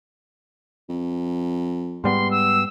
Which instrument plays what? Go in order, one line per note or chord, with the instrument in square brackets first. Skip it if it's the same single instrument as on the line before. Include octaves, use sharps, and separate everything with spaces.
[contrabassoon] F2
[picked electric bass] G#2 G3 B3 [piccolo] C6
[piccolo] E6